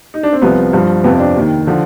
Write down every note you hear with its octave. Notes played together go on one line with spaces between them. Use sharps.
D#4
D4
C4
C2 C3 F3 B3
G2 F3
F2 C3 F3 B3
D4
D#2 D#3
D3 F3